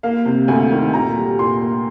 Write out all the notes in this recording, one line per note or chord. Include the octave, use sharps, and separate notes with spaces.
A#3 F5
C3
D2 G#5
D#3
A#2 A#5
G3
A#2 C6
A#3